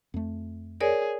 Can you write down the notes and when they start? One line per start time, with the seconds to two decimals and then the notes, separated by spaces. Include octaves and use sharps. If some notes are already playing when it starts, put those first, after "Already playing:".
0.14 F2 A3
0.81 G#4 A#4 C#5 D5